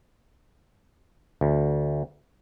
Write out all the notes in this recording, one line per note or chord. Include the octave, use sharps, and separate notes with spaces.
D2